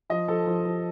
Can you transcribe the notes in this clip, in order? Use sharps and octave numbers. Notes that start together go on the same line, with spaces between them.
F3 D#5
F3 A4
F3
F3